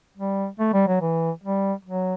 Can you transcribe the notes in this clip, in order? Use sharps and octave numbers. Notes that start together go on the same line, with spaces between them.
G3
A3
G3
F#3
E3
G3
F#3